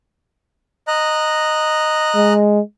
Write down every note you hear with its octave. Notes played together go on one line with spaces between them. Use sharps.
D#5 A#5 F#6
G#3